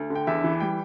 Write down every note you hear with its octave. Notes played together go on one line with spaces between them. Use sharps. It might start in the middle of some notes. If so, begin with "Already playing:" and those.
Already playing: D2
D3
G5
E2 E5
E3
G3 G5